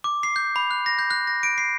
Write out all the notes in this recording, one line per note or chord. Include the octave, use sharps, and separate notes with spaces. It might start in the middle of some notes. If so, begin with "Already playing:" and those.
D6
C7
G6
B5
F#6
A#6
G6
F#6
A#6
D7
C7